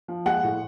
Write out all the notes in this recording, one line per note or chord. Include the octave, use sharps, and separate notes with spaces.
F3
G#3 F#5
A2